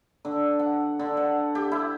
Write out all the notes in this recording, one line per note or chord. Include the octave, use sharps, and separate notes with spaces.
D3
F#5
D3
F#5
G4
E4